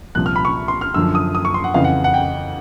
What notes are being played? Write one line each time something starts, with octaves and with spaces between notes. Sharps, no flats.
C2 A#2 F3 F#6
F6
B5
C#6
C6
F6
F#2 D3 F3 E6
D#6
D#6
C#6
C6
F#5
F2 C#3 E3 F5
F#5
F#5
G5